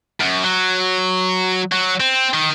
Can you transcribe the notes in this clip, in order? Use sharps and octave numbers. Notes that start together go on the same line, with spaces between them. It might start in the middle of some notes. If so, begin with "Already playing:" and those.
F#2
F#3
F#3
C4
D#3